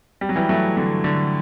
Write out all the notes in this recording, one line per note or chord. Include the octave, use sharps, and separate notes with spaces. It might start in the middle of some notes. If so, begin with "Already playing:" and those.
G3
F#3
E3 G3
F#3 A3
D3 F#3
D3